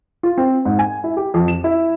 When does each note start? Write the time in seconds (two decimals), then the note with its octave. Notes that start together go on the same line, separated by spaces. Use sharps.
0.23 F4
0.38 C4
0.65 G#2
0.79 G#5
1.04 E4
1.17 G4
1.34 F2
1.48 E7
1.64 E4